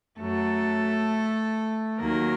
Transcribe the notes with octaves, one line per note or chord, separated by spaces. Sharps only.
F#2 F#3 A3 A4
D#2 D#3 F#3 A#3 A#4